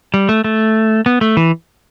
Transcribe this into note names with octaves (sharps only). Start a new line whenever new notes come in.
G3
A3
A3
B3
A3
E3